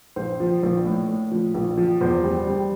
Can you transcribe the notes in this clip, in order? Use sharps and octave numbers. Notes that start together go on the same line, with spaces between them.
A#1 C5
F3
A#1
A2
A2
F3
A#1
F3
E2 C5
G3
G3